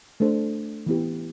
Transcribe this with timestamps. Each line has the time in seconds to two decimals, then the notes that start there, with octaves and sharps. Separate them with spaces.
0.20 A3 D4 A4 C5
0.86 E3 B3 E4 G4